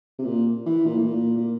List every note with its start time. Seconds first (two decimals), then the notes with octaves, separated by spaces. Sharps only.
0.19 C3
0.25 A#2
0.66 E3
0.86 A#2
0.98 A2
1.06 A#2
1.37 A#2